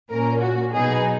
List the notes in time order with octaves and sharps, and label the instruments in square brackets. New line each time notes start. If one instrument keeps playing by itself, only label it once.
[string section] A#2 A#3 C#4 A#4
F#4
B2 F#3 B3 D#4 G#4